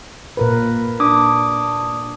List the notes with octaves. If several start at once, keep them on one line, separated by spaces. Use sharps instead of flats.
A#2 A#4 B4
D4 D6 D#6